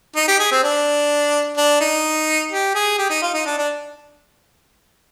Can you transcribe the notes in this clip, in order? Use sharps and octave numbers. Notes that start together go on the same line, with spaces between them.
D#4
G4
G#4
C4
D4
D4
D#4
G4
G#4
G4
D#4
F4
D#4
D4
D4